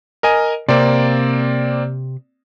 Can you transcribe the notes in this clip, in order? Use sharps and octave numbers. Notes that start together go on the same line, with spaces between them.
A#4 D#5 G#5
C3 A#3 C4 D5